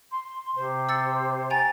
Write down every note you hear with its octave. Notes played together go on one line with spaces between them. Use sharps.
C6
C3 C5
E6 A6 C#7
G5 G#5 A#5 A6